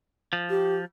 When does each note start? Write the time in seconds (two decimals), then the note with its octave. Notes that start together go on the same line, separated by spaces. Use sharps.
0.33 F3
0.50 G4